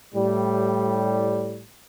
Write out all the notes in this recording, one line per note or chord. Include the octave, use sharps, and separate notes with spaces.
A2 G3